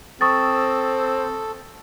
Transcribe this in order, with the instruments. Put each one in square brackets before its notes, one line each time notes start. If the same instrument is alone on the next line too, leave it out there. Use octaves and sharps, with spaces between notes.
[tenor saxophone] C4 [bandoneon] A4 [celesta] C#6 D#6 A6